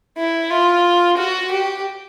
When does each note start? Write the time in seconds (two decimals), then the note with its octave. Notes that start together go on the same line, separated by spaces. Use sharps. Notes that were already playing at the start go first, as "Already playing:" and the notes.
0.18 E4
0.51 F4
1.17 F#4
1.51 G4